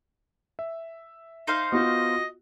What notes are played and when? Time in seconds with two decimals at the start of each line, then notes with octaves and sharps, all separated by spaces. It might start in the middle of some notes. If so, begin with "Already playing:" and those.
0.59 E5
1.47 D#4 C5 F5
1.72 B3 F4 F#4 D#5